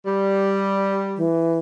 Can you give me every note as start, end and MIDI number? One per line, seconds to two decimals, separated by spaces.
0.05 1.24 55
1.17 1.58 52